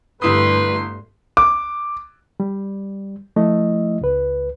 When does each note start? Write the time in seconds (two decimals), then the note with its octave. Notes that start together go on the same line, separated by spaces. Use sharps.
0.22 G1 G2 G3 A3 E4 B4 C6 D#6
1.37 D6
2.40 G3
3.36 F3 A3 E4 D#5
4.01 C#2 B4